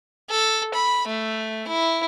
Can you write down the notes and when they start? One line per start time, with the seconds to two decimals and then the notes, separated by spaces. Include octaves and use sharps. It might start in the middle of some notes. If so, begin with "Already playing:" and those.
0.30 A4
0.74 B5
1.08 A3
1.68 E4